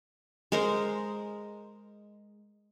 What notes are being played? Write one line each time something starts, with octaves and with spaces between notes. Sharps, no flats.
G#3 A#4 C5